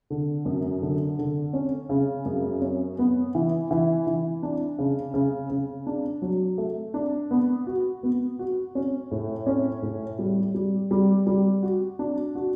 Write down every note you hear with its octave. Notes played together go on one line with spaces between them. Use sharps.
D3
F#2
D3
D3
C#4
C#3
F#2
C#4
B3
E3
E3
E3
D4
C#3
C#3
C#3
D4
F#3
A3
D4
B3
F#4
B3
F#4
C#4
A2
C#4
A2
G3
G3
G3
G3
F#4
D4
F#4